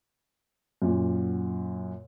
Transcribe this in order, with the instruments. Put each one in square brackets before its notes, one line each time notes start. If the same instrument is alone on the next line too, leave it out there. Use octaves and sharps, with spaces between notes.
[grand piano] F#2 A#2